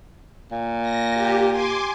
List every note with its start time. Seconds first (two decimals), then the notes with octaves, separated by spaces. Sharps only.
0.51 A#2
0.82 A#6
1.15 G4
1.51 G#5 C6 D6